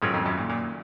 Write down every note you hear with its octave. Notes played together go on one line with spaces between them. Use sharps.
G#2 D#3 F#3 C#4 F4 A#4
F2
F#2
A#2
A#2